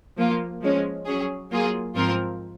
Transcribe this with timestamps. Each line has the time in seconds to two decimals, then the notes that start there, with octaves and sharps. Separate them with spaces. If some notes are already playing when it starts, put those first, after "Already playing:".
0.17 F3 A#3 F4
0.62 F3 G#3 C#4
1.06 F#3 C#4 G#4
1.50 F#3 A#3 F4 G#4
1.95 G#2 F3 C4 F4 A#4